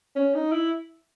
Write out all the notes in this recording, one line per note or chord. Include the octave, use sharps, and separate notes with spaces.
C#4
D#4
E4